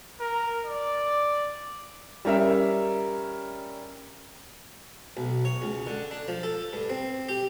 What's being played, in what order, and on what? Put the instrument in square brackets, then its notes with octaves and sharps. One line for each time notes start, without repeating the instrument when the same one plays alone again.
[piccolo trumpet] A#4
D5
[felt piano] G3 C#4 A#4 E5
[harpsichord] B1
C#5
C#2
D3
D4
F3
A4
G2
C4
G4